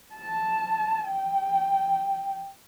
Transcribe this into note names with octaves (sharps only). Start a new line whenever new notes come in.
A5
G5